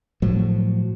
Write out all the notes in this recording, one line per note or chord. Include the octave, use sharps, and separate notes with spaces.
A2 F3 F#3